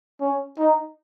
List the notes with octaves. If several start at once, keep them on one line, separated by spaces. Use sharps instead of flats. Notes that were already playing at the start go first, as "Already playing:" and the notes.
C#4
D#4